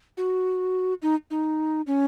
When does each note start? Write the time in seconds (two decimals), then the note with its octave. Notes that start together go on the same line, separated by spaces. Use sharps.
0.17 F#4
1.02 D#4
1.31 D#4
1.87 C#4